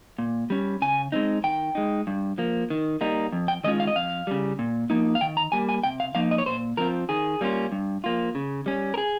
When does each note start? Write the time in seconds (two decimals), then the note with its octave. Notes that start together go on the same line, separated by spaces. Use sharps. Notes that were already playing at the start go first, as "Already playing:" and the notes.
0.18 A#2
0.50 G3 C#4
0.82 C#3 G#5
1.12 G#3 C4 D#4
1.44 D#3 G5
1.75 G#3 D#4
2.07 G2
2.38 F3 A#3
2.70 D#3
3.01 G3 A#3 D#4
3.32 F2
3.48 G5
3.64 D#3 G#3 C#4 F4 D#5
3.80 F5
3.87 D#5
3.96 F2 F5
4.27 C#3 G3
4.59 A#2
4.90 F3 A#3 D#4
5.15 F5
5.21 D#3 G5
5.37 A#5
5.52 G3 A#3 G#5
5.69 G#5
5.84 C3 G5
6.00 F5
6.15 F3 A#3 D#4 F5
6.31 D#5
6.38 C#5
6.46 A#2 C5
6.77 F3 C4 F4 A#4
7.09 D#3 G#4
7.41 G3 A#3 C#4 F4
7.72 G2
8.04 F3 A#3 F4
8.35 C#3
8.66 G3 C#4
8.94 A#4
8.98 G#4